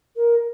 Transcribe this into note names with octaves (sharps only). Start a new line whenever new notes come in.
A#4